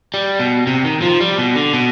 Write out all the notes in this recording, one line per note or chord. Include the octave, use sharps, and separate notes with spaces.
G3
B2
C3
D#3
F3
G3
B2
D3
B2